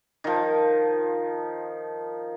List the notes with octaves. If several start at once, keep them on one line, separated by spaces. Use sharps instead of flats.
D#3 F3